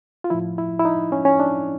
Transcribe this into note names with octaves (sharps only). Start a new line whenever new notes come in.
F4
A2 F3 E4
E4
E4
D#4
C#4
C#4
D4